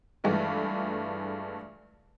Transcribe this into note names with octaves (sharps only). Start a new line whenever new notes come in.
G2 E3 G#3 A3 F4